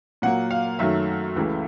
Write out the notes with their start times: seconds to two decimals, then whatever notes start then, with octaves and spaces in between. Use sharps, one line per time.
0.22 A#2 F#3 A#3 F#5
0.51 F5
0.79 F#2 D#3 F#3 A3 E5
1.36 C#2 C#3 E3 A3